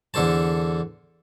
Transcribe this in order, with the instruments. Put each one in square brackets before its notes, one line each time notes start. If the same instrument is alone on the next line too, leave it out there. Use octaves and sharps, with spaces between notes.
[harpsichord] E2 D3 A4 C5 A5